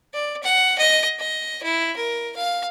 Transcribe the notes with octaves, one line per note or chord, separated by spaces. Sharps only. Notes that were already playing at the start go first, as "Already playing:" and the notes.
D5
F#5
D#5
D#5
E4
A#4
F5